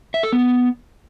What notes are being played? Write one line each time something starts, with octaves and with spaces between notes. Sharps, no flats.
E5
A4
B3